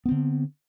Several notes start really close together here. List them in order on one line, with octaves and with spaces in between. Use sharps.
B3 C4 D3